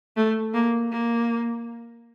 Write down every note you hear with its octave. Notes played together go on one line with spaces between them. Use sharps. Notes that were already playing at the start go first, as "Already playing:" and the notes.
A3
A#3
A#3